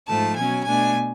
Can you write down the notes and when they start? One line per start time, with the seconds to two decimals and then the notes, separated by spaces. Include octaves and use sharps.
0.09 G#2 F3 A3 A5
0.37 B2 F#3 C#4 G#5
0.66 B2 A3 D4 G#5